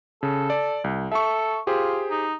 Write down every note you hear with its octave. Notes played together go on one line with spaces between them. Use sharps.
C#3 A4
D5
C2
A4 E5 C#6
F4 G4 G#4 C5
D#4